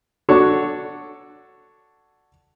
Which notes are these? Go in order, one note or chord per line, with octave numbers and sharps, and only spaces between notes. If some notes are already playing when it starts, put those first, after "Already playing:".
D4 F#4 A4 C#5